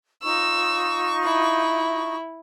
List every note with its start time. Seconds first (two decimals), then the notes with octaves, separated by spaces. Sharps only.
0.23 D#4 F4 C#6 E6
1.24 E4